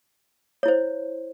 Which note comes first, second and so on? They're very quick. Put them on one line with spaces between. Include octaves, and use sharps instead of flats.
C#5 E4 C5